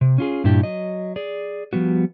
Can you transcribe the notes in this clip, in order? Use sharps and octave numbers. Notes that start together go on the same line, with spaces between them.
C3
C#4 F4 G#4
G2 A#2 D4 E4 G4
F#3 D#5
G#4 D5
F3 G3 B3 F#4